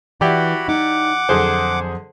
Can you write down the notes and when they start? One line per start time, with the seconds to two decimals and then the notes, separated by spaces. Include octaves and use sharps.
0.21 E3 E4 F#4 G4 D5 F#5 B5
0.68 D#4 F#5 D6
1.29 F2 D3 F#3 G#4 C5